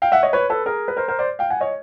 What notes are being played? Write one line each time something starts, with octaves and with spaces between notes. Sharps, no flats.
F5 G5
E5 F#5
C#5 D#5
B4 C#5
A4 B4
G#4 A#4
B4
A#4 C5
A#4 C5
C5 D5
F5 G5
F#5 G#5
C#5 D#5